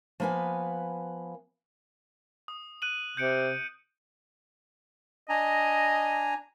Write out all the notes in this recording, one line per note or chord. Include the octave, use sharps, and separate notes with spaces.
F3 A#3 B3 B4 G#5
D#6
F#6 D#7 F#7
C3 G6 C#7 D7
D4 D#5 G#5 A#5